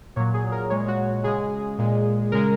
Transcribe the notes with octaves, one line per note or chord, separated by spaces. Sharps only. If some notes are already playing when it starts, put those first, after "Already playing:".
A#2 F#3 C#5
G#4
A#4
A#2 G#3 C#5
F#4
C#3 G#3 G#4
A#2 G#3
C#3 G#3 A#4